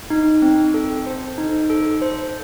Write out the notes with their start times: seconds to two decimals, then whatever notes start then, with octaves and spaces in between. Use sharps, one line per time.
0.10 D#4
0.42 C4
0.74 A4
1.06 C5
1.38 D#4
1.70 A4
2.02 C5